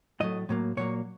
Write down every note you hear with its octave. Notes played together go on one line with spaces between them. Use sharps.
A2 F#3 A3 D#5
A2 F#3 A#3
A#2 F#3 A#3 C#5